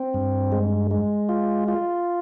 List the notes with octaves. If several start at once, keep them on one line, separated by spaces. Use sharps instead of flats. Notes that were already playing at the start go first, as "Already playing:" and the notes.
Already playing: C4
G2
G#3
G#3
F4
F4